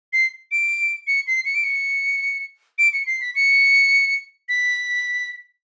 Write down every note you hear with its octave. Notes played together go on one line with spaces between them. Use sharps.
C7
D7
C#7
C7
C#7
D7
C#7
D7
C#7
C7
B6
C#7
B6